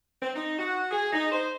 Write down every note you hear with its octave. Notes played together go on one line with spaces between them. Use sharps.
C4
D#4
F#4
G#4
D#4
C5